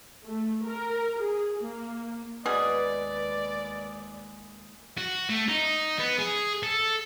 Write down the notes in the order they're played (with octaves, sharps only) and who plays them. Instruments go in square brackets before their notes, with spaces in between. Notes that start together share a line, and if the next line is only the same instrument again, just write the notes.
[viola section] A3
A#4
G#4
A#3
[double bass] D#2 G#3 [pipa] B2 G#4 [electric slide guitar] B4 [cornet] D5
[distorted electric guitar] F#4
A3
D#4
B3
G#4
A4